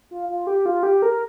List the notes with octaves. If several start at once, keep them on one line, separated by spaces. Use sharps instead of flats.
F4
F4
G4
F4
G4
A#4